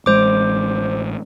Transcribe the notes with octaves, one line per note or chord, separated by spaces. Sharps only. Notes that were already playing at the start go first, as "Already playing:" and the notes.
A1 G#3 C5 D6